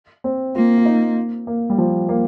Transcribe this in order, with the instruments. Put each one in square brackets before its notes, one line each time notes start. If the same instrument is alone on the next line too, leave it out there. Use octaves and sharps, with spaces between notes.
[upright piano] C4
[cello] A#3 [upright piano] F4
[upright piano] F4
D#4
A#3
G3
F3
A#3